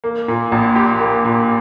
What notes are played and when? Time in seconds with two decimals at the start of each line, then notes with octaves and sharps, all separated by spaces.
0.04 A#3
0.28 A#2
0.52 A#1
0.76 G4
1.00 A#3
1.25 A#2